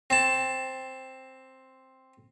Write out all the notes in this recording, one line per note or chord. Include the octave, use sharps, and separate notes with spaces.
C4 A5